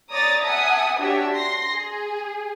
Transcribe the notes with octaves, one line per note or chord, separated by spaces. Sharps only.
C#5 D5 A#5 D#6 A6
E5 F#5 G#5 A5 D#6
D4 F#4 G4 C#5 E5
C6 A#6
G#4